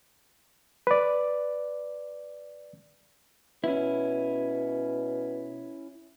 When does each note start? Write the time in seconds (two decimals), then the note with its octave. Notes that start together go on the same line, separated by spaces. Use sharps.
0.87 B4 D5
3.64 B2 C#4 E4